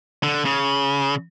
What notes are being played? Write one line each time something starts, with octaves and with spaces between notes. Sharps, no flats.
D3
C#3